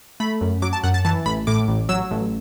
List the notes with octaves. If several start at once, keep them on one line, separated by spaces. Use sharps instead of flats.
A3 B5
F#2
F#3 D6
A5
F#2 F#5
A5
E3 A5
A1 B5
A2 D6
A1
F#3 E6
A1